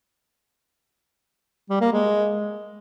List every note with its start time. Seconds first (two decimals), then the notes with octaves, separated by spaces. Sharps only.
1.70 G3
1.81 A#3
1.92 G#3